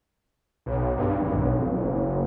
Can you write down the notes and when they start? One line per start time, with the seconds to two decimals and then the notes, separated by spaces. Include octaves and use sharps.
0.66 B1
0.97 G2
1.21 G#1
1.35 B1
1.57 F1
1.74 F#1